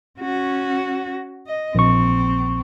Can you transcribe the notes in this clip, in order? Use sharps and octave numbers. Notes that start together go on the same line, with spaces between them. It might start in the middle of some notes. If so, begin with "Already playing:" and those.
C#4 F#4
D#5
A#1 C4 C#6